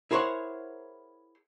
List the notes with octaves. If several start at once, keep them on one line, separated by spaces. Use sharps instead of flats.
E4 G#4 A#4 C5 C#5 F#5